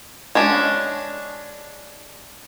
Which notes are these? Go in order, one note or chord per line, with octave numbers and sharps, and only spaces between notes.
G#3 C#4 D4